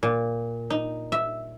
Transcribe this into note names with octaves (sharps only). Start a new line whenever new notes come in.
A#2
D#4
E5